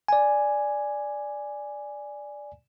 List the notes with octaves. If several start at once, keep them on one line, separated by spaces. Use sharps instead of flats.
D5 G#5